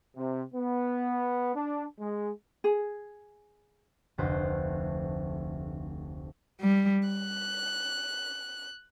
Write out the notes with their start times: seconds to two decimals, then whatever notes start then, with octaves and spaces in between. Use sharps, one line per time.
0.16 C3
0.55 B3
1.55 D4
2.00 G#3
2.64 G#4
4.18 F1 D2 B4 C5 F5
6.61 G3
7.09 F#6